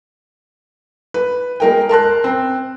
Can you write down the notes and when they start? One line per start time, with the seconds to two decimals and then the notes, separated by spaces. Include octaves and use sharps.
1.14 B4
1.60 G#3 A#4 G5
1.89 A#4 A5 C6 F#6
2.24 C4